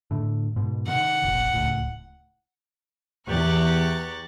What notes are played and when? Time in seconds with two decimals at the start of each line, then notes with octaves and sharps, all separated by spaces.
0.11 A2 D3
0.56 G#2 B2
0.88 C3 D#3 F#5
1.23 F1 A#1
1.51 D1 C#2 A2
3.28 E2 G4 A#5 C#6 F#6 A6